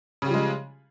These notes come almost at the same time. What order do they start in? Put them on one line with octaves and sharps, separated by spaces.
C#3 G3 F3 G#3